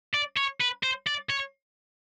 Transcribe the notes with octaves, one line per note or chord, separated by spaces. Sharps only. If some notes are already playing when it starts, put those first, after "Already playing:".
D5
C#5
B4
C5
D5
C#5